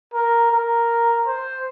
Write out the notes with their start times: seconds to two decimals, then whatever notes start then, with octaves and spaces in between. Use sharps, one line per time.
0.14 A#4
0.51 A#4
1.26 C5